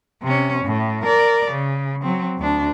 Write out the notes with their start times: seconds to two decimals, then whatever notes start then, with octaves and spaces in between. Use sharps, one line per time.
0.23 C3 C#4
0.65 A2
1.03 A#4 D5
1.51 C#3
2.02 F#3 C4
2.37 D2 D4